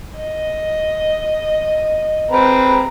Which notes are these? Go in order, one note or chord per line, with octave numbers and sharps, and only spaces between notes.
D#5
C4 B4 A#5